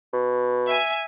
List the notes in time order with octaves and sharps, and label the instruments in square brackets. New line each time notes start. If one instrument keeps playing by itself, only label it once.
[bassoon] B2
[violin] E5 G#5